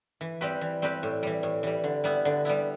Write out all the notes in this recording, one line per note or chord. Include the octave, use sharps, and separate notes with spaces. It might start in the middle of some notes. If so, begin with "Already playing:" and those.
E3
G3 C4 G4 B4
E3
G3 C4 G4 B4
A2
E3 G3
A2
E3 G3
D3
G3 B3 E4
D3
G3 B3 E4